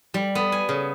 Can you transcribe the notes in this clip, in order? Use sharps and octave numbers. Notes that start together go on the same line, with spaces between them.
G3
B3
G#5
C#3